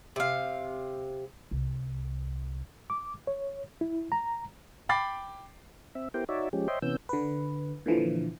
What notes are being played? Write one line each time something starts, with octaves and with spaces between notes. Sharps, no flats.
C3 F5
C2
D6
C#5
E4
A#5
G5 B5 D6 A6 C7
C4 E5
B3 E4 G4 A#4 C5 G5
D#4 F#4 C#5 D5 E5
F3 G#3 C#4 G4
C5 C#5 D#5 E5 G5 C6
C3 E3 B3 C#4 E6 G6
D3 B4
A#2 D3 E3 F3